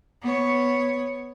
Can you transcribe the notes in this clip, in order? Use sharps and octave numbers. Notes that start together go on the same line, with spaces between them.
B3 C#5